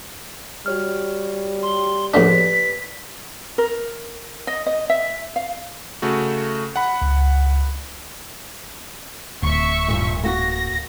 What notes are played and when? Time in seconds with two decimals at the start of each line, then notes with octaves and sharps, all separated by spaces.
0.66 G3 F#4 C#5 F6
1.63 C6
2.14 A#1 A2 D4 G4 B4 D5 B6
3.58 A#4
4.47 D#5
4.66 D#5
4.90 E5
5.36 F5
6.02 C#3 A3 F#4
6.76 F#5 B5
7.02 C#2
9.42 D1 E5 C#6
9.88 G2 A#2
10.23 A#3 F#4 A#6